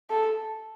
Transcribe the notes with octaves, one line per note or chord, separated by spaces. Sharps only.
A4